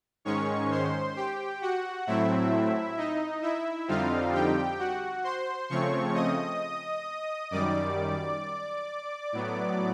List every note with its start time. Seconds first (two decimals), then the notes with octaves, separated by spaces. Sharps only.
0.25 G#2 D#3 G#3 C#4 C#5 C#6
0.71 C5 C6
1.16 G4 G5
1.62 F#4 F#5
2.07 A2 F#3 A3 C4 E4 E5
2.97 D#4 D#5
3.42 E4 E5
3.88 F2 D3 G3 C4 D#4 F4 F5
4.33 G4 G5
4.79 F#4 F#5
5.24 C5 C6
5.69 C#3 F3 A3 C4 C#5 C#6
6.15 D#5 D#6
7.51 F#2 D#3 G3 D5 D6
9.32 A2 F#3 B3